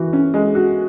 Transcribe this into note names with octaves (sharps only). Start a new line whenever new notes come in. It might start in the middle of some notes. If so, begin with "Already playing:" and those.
Already playing: E3 F#4
C#4
G#3
F#4